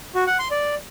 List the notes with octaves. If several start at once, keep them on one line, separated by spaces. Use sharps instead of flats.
F#4
F#5
C6
D5